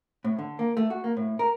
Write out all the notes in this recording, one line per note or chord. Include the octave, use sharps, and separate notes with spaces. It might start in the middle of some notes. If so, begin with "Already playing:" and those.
A2
D3
A#3
A3
F#4
A#3
A2
A#4